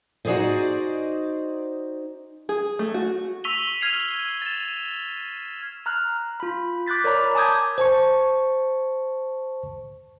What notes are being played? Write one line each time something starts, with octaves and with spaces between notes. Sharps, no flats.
D#4 F#4 G#4 C5 D5 D#5
G#4
A3
F#4
C#6 E6 B6 D#7 F7 G7
F6 G#6 C7 D#7 F7
A6 E7
A#5 F6 F#6
F4 B5
D6 F#6 G6 A6 B6
A#4 C#5 D5 A#5 B5
G#5 A5 D6 D#6 G6 G#6
C5 A5 C#6